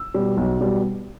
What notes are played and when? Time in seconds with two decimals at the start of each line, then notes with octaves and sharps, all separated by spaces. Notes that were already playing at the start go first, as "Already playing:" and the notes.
Already playing: E6
0.14 B2 G3
0.37 B1
0.60 B2 G3